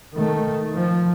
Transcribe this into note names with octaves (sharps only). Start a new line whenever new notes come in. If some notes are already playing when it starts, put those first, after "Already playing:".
D#3 A3
F3